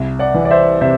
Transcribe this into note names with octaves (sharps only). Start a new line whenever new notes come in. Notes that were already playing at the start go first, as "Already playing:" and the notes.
Already playing: C2
D5 F#5
E3
D5
C5 E5
C3 C5 E5